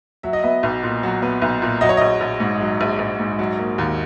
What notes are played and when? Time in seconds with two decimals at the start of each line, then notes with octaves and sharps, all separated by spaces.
0.23 F#3 E5
0.33 D#5
0.43 B3 E5
0.63 B1
0.83 A#2
1.03 F#3
1.22 B3
1.42 B1
1.62 A#2
1.81 F#3 D#5
1.89 C#5
1.97 A#1 D#5
2.21 A#1
2.40 G#2
2.61 F#3
2.81 A#1
2.99 A#1
3.20 G#2
3.39 F#3
3.59 A#3
3.78 D#2